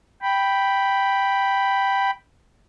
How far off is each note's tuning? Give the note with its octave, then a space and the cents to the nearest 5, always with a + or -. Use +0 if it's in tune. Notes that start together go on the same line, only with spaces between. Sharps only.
G5 +0 B5 +0